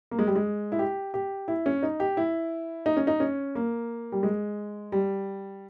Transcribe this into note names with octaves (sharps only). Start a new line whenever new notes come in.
A#3
G#3
G3
G#3
E4
G4
G4
E4
C#4
D#4
G4
E4
D#4
C#4
D#4
C#4
A#3
G3
G#3
G3